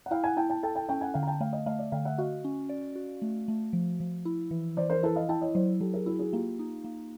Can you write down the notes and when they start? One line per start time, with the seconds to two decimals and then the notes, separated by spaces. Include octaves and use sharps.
0.06 F#5
0.11 E4 F5 G5
0.24 F#5 G#5
0.37 E4 G5 A5
0.50 G5 A5
0.63 A4 G5 A5
0.75 G5 A5
0.89 C#4 G5 A5
1.01 F#5 G#5
1.14 D3 F5 G5
1.23 A#5
1.27 G5 A5
1.41 A3 F5 G5
1.53 D#5 F5
1.66 A3 D#5 F5
1.79 D5 E5
1.92 D3 F5 G5
2.05 E5 F#5
2.18 F#4 D#5 F5
2.45 C#4
2.69 D5
2.96 F#4
3.22 A3
3.48 A3
3.73 F3
4.00 F3
4.25 E4
4.51 E3
4.77 E3 C5 D5
4.90 A#4 C5
5.03 E4 A4 B4
5.16 D#5 F5
5.29 E4 G5 A5
5.41 C#5 D#5
5.55 F#3 C5 D5
5.80 F#3 G4 A4
5.94 G#4 A#4
6.06 E4 F#4 G#4
6.19 F#4 G#4
6.32 A#3 F4 G4
6.59 D#4
6.84 A#3